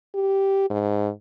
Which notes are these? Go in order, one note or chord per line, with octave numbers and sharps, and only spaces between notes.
G4
G#2